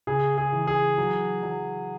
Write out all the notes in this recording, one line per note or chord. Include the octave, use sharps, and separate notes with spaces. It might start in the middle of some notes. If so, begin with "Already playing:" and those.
C#3 G#4
G#4
E3
G#4
F#3
F#3